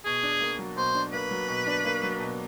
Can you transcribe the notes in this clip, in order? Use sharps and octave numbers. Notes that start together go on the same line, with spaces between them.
B2 G#4
D4
A#3
F#3
B2 C5
D4
A#3 B4
F#3
B2
D4
A#3
F#3
B2